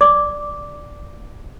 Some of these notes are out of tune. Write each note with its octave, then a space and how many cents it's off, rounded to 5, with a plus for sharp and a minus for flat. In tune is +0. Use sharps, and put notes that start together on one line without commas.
D5 +0 D6 -5